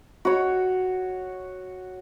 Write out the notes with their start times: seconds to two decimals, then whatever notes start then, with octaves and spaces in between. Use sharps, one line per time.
0.25 F#4 C#5